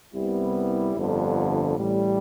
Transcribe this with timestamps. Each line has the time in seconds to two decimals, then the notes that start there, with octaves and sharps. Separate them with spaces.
0.13 C2 C3 G3 B3 E4
0.96 G1 F2 D3
1.78 A1 A2 G3